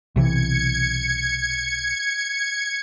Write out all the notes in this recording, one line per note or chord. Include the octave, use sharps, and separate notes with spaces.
B1 C3 E3 G#6 C#7